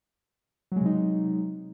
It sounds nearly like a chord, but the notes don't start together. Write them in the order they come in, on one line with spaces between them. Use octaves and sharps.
F#3 G#3 C3 D#4